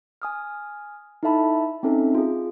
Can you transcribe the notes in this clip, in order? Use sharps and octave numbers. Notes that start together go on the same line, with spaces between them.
G#5 D#6 F6
D#4 E4 A4 E5 A5 B5
C4 C#4 D#4 A4 E5
F4 G#4